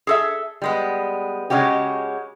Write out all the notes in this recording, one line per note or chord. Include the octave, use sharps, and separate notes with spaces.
G#4 A4 E5
G3 G#3 B3
C#3 G#3 C#4 F#4 G4